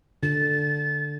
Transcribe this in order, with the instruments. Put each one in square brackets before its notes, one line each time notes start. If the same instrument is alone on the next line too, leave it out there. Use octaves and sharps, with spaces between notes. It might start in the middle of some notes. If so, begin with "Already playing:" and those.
[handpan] D3 [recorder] A6